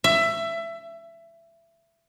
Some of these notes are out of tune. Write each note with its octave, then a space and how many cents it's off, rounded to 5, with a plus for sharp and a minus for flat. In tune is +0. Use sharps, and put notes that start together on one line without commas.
E5 +20